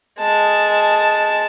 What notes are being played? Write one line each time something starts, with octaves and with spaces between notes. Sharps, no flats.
G#3 A5